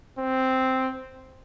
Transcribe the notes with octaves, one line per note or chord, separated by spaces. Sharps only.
C4